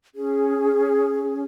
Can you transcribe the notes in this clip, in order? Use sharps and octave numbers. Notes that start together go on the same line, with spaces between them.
C#4 G#4